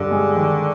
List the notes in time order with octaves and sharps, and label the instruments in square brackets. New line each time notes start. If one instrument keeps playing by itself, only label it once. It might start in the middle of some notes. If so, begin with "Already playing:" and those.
Already playing: [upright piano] G2 [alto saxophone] D3
[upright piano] G#3
D#3